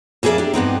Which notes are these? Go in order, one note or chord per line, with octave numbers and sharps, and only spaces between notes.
F2 A#3 G#4 A4 D5 E5
D4 G4
G2 B3 C4 D#4